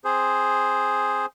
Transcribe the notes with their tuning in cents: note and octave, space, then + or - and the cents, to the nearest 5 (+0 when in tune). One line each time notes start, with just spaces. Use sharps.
C4 +0 G#4 +0 C5 +0